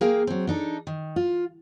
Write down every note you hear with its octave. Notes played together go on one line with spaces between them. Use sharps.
A#3 G#4 A#4 F5 G5
F#3 C4
D4 D#4 A4
D#3
F4